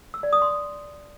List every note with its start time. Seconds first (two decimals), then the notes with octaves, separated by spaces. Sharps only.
0.14 E6
0.23 D5
0.33 D#6
0.42 C6